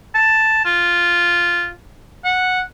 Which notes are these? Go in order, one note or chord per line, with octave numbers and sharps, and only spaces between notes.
A5
F4
F#5